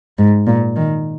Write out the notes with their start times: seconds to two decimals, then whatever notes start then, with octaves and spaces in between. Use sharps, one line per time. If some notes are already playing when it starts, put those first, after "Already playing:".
0.18 G#2
0.47 A#2
0.76 D#3